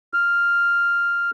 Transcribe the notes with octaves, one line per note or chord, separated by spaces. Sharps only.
F6